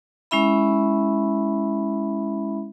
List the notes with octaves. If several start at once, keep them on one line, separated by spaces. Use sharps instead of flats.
G#3 C#4 E4 E5 B5